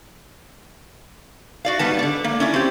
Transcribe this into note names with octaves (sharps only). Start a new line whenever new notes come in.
F#4 D5 F5
G#2 G3 B3 A5
D3 D5
A#3
C#4 E4 D5
C4 G4